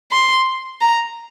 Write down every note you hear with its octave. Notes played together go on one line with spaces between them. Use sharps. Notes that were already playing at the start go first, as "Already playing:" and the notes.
C6
A#5